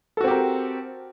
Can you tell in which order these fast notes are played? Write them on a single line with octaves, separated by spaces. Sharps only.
A4 F#4 C4 G4 A#4